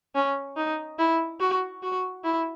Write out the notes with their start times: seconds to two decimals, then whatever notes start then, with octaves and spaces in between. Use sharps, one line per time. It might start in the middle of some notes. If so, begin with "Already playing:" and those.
0.15 C#4
0.57 D#4
0.99 E4
1.40 F#4
1.83 F#4
2.24 E4